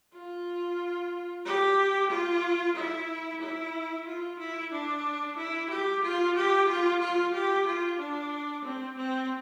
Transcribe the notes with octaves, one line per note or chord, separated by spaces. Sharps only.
F4
G4
F4
E4
E4
F4
E4
D4
E4
G4
F4
G4
F4
F4
G4
F4
D4
C4
C4